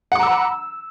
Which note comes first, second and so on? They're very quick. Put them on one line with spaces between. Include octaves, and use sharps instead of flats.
F#5 D6 A#5 E6 B5